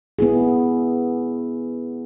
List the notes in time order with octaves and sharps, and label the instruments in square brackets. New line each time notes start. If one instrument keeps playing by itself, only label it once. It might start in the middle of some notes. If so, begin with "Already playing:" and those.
[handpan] B3 E4 G#4